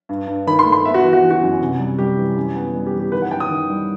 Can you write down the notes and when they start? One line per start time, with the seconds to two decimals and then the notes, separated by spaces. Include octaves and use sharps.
0.09 G2
0.27 G2
0.47 D#3 B5
0.59 C6
0.65 A3
0.72 C6
0.85 B3 E5
0.94 F#4
1.03 E3
1.13 F#4
1.23 E3
1.30 F#4
1.42 F#2
1.61 C3
1.79 G3
1.99 G3 G4
2.17 E3
2.36 F#2
2.55 B3
2.75 G3
2.87 G4
2.94 E3
3.00 G4
3.12 D#3 B4
3.22 F#5
3.31 F#2 G5
3.40 D#6
3.50 D#3
3.70 G3